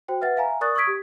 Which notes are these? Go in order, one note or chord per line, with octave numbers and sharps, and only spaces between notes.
F#4 C5 G5
B4 E5 F#5 A6
E5 F5 G#5 A#5
A#4 D5 C#6 D#6 F#6 A6
C#6 D#6 E6 G#6 B6 D7
G4